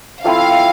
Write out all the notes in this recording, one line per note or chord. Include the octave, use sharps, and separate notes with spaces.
F3 A3 C4 E4 F5